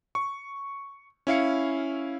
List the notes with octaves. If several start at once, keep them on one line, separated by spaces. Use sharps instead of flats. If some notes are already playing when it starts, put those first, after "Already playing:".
C#6
C#4 E4 F5 C#7